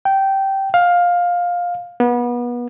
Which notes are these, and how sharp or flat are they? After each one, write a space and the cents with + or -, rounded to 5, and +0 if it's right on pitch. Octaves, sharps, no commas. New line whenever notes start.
G5 -15
F5 +15
B3 -30